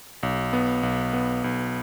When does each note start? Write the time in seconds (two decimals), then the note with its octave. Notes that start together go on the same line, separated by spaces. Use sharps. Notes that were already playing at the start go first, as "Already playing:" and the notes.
0.23 B1
0.53 B3
0.83 B1
1.13 B3
1.44 B1